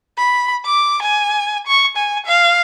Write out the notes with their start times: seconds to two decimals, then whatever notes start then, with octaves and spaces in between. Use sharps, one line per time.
0.18 B5
0.66 D6
1.02 G#5
1.67 C#6
1.97 G#5
2.26 F5